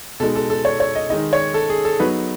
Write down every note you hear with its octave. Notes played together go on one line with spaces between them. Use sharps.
B2 G#3 D#4 A4
A4
A4
C#5
C#5
D#5
D#3 G#3 D#4 D#5
C#5
A4
G#4
A4
F#3 B3 D#4 B4